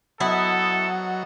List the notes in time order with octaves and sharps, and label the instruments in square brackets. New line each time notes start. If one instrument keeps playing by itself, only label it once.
[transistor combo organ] F#3 [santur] B3 D#5 [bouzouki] E4 [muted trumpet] A4